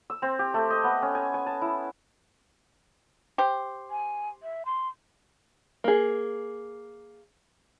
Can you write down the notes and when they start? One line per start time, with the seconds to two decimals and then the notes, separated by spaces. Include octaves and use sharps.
0.10 E6
0.22 C4
0.39 G4
0.54 A3
0.70 D#5
0.84 B3
1.02 C#4
1.15 G#5
1.34 G#5
1.46 A5
1.62 E4
3.38 G4 C5
3.90 G#5
4.43 E5
4.66 C6
5.84 A#3 G#4